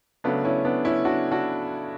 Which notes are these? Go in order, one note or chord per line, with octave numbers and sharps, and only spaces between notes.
C#3 F#3 A3 B3 D4
C#4 E4
B3 D4
C#4 E4
D4 F#4
D4 F#4